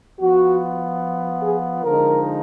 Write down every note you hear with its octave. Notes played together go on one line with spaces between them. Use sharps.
F3 B3 F4 F#4
G#4
D3 F3 G#3 D#4 A#4